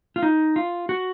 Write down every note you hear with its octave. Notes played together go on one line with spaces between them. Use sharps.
F4
D#4
F4
F#4